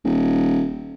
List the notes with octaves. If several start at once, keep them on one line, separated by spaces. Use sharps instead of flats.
D#1